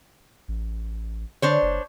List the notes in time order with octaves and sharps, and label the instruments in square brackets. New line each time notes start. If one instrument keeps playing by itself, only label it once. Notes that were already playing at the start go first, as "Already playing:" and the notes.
[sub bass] A1
[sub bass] D3 [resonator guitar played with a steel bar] D4 C5 C#5
[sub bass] F#1